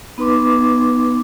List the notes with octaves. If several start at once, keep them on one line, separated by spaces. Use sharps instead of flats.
B3 D#4 B4 C6 D6